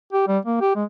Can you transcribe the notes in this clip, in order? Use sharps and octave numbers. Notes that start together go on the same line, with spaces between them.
G4
G3
A#3
G4
G#3